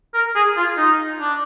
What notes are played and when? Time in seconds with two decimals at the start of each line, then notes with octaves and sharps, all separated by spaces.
0.14 A#4
0.35 G#4
0.57 F4
0.77 D#4
1.21 D4